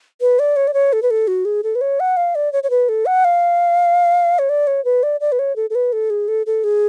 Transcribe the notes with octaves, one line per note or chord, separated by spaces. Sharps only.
B4
D5
C#5
D5
C#5
A4
B4
A4
F#4
G#4
A4
B4
C#5
F#5
F5
D5
C#5
C#5
B4
A4
F#5
F5
C#5
D5
C#5
B4
D5
D5
B4
C#5
A4
A4
B4
A4
G#4
A4
A4
G#4